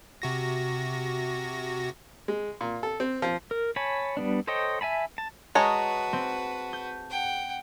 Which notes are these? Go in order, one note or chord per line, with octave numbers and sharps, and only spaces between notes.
C3 F#4 A#6
G#3
A#2
A4
C4
F3
A#4
C#5 G#5 A5 B5
G3 B3 D4
A4 C5 C#5 D#5 G5
E5 G#5 A5 B5
A5
G#3 F#4 B4 C#5 A5 A#5 D#6
C4
G6
F#5 G5